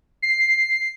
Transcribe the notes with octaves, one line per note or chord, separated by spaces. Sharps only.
C7